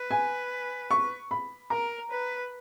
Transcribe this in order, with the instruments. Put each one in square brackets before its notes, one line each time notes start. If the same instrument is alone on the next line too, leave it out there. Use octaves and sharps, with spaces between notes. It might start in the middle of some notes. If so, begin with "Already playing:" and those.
Already playing: [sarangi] B4
[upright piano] G#5
C#6
B5
[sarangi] A#4 [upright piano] A#5
[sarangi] B4